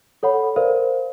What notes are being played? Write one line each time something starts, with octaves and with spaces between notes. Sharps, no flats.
A4 C#5 F#5 B5
A#4 C5 D5 F5